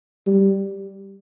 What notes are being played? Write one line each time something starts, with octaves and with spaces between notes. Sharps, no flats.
G3